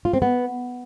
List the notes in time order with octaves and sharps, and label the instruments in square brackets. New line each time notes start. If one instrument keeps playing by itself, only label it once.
[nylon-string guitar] F4
C4
B3